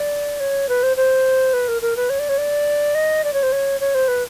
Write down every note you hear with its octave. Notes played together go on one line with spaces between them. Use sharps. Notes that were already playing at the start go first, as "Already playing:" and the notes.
Already playing: D5
C#5
B4
C5
C5
B4
A#4
A#4
B4
C#5
D5
C#5
D5
D#5
D5
C#5
C5
C#5
C#5
C5
B4